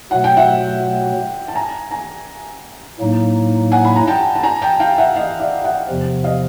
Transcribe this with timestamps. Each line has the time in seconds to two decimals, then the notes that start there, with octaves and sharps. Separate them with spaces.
0.11 B2 F#3 A3 F#5
0.24 G5
0.36 E5 F#5
1.48 A5
1.55 G#5 A#5
1.91 G#5 A#5
3.00 A2 F#3 A#3 D#4
3.72 F#5 G#5
3.85 B5
3.96 A#5
4.07 G5 A5
4.36 A5
4.43 G#5 A#5
4.62 G5 A5
4.80 F5 G5
4.98 E5 F#5
5.16 D#5 F5
5.40 D5 E5
5.64 E5 F#5
5.88 E2 C3 F3
6.24 D#5 F5